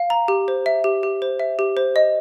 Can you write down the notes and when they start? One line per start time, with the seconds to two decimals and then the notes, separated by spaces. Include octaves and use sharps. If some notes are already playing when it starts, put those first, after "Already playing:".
Already playing: F5
0.10 A#5
0.28 G4
0.48 C5
0.66 E5
0.84 G4
1.03 G4
1.22 C5
1.40 E5
1.59 G4
1.77 C5
1.96 D#5